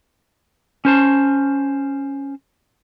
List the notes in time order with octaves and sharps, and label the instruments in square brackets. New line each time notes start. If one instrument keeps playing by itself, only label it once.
[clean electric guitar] C#4 C5 A5